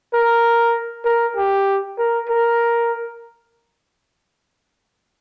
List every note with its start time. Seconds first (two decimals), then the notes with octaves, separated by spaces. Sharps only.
0.13 A#4
1.05 A#4
1.36 G4
1.98 A#4
2.29 A#4